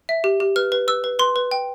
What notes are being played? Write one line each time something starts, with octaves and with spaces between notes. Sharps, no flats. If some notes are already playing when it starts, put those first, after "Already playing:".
E5
G4
G4
B4 F6
B4
B4 E6
B4
B4 C6
B4
G5